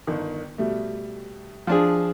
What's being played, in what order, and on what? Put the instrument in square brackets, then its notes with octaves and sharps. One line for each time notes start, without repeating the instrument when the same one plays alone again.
[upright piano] G1 D#3
B2 G3 A3
[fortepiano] F3 D4 G#4